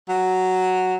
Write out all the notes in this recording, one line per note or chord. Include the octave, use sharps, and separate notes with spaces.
F#3